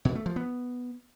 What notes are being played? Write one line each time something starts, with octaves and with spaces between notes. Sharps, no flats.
B2
A3
F3
B3